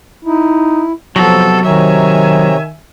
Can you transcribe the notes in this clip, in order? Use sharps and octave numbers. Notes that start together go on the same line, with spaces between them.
D#4 E4
C3 F3 F#3 B3 A4
C3 D#3 C#5 E5 G#5 A#5